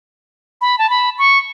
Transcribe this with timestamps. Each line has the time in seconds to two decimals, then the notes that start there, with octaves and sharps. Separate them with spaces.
0.61 B5
0.78 A5
0.90 B5
1.18 C#6